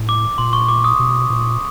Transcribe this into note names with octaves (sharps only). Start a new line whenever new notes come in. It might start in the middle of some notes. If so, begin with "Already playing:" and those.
Already playing: A2
D6
A#2 C6
C#6
D6
D#6
B2
A#2